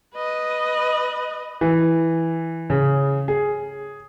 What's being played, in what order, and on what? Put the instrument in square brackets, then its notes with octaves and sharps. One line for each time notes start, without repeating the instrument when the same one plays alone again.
[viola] B4 D#5
[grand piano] E3
C#3
G#4